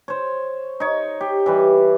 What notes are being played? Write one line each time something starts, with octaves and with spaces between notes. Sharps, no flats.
C5 C#5
D#4 C#5
G4
E3 G3 B4